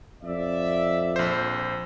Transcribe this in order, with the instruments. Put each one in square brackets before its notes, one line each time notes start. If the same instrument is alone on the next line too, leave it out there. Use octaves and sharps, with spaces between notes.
[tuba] F2 [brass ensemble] D5 E5
[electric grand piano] A#1 C5